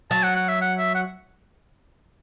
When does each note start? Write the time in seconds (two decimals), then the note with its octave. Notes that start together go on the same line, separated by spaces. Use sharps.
0.11 F#3 A5
0.23 F#5
0.36 F#5
0.48 E5
0.62 F#5
0.78 E5
0.95 F#5